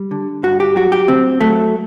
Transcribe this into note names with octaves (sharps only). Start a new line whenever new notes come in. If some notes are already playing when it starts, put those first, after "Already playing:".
Already playing: G3
D3
G2 F#4
G4
F#3 F#4
G4
D2 C4
F#3 A3